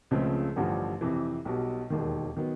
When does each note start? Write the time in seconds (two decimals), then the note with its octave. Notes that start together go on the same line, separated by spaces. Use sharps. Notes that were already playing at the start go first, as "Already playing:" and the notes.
0.11 C#2 C#3 F3 A3 C4
0.56 A1 G2 D3 F3
1.01 F2 C3 E3
1.45 B1 B2 G3
1.90 E1 D#2 D#3
2.37 D#3 F#3 B3